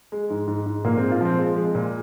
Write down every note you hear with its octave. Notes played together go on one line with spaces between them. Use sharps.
G#3
G#2
G#2
G#2
A#2 A#3
G#3 C4
F4
F3 C4
G#3
G#3
A#2